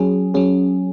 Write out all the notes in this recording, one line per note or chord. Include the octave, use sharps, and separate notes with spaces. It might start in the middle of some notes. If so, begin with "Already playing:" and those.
Already playing: F#3 C#4 G#4
F#3 C#4 G#4